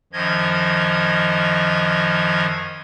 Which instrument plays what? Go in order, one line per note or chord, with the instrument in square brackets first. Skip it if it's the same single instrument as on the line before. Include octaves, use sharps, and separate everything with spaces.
[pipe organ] F#2 D#3 F3 D#5 G#6